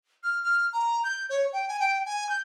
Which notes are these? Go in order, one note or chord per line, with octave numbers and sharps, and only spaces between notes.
F6
F6
A#5
G6
C#5
G5
G#5
G5
G#5
G6